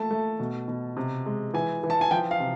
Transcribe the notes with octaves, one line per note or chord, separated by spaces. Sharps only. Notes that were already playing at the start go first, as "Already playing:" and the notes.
Already playing: A3 A#3 A5
A3
B2
B2
C3
G#3
E3 G#5
E3
A5
G#5
F3 G5
F5
C3